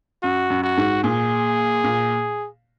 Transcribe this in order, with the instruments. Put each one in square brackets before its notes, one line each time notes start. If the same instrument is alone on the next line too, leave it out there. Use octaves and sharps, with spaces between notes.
[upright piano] F#2 [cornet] F#4
[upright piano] F#2
[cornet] F#4
[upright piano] G#2
[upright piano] A#2 [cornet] G#4
[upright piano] A#2